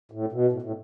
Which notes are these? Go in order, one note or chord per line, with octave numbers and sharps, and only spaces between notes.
A2
B2
A2
A2